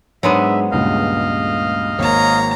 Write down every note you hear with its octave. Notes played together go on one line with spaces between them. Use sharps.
G#2 F#3 G#3 B3 D4 E5 D#7
C#2 G2 A#2 D#5 F5
G#1 A#3 C#5 A#5